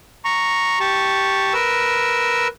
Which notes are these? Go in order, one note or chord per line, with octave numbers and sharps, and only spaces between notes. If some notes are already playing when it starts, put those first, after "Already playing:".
A#5 C#6
G4 A5 C#6
A#4 B4 E6